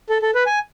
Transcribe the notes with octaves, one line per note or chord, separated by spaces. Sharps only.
A4
A4
B4
G#5